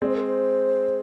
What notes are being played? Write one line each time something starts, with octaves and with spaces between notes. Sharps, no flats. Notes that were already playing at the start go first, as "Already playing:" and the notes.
G#3 C4 D5
C5
A#4
C5